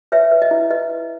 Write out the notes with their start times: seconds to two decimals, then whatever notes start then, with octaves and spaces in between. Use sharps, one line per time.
0.12 B4 C#5 E5
0.32 B4
0.42 D#5
0.51 E4
0.70 B4 D#5